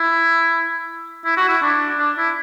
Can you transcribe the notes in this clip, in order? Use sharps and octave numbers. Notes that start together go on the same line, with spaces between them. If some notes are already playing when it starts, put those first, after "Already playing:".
Already playing: E4
E4
F#4
E4
D4
D4
E4